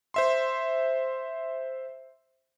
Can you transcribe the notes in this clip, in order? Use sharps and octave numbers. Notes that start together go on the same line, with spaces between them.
C5 E5 C6